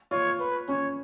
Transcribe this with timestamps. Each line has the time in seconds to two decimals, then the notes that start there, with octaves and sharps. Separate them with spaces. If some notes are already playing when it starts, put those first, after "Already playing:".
0.11 F4 C#5
0.39 B4
0.68 C#4 C#5